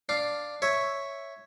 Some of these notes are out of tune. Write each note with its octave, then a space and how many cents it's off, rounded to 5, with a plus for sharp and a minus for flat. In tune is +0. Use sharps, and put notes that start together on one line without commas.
D4 +0 F5 +0
C#5 +0 E5 +0